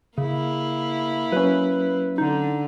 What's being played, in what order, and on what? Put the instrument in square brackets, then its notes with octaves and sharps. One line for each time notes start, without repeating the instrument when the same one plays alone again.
[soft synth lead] C#3 [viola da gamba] A#3 E4
[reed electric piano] F#3 C#4 [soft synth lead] B4
[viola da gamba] D3 [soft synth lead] D#4